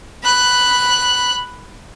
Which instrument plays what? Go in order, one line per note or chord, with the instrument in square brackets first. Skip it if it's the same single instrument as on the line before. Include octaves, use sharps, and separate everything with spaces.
[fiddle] B5 F#6